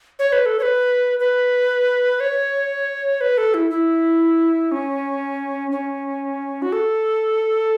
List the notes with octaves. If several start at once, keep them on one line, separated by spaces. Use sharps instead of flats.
C#5
B4
A4
C#5
B4
B4
C#5
B4
A4
E4
E4
C#4
C#4
F#4
A4